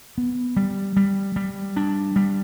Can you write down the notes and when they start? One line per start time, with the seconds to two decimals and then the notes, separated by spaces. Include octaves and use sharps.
0.18 B3
0.57 G3
0.97 G3
1.36 G3
1.76 D4
2.16 G3